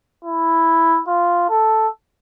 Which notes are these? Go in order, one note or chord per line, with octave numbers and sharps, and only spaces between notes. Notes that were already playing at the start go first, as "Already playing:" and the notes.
E4
F4
A4